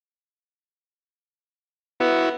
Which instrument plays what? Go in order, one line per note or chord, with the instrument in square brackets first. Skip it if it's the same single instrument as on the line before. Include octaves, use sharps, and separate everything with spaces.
[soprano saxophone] B3 [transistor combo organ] E4 F#4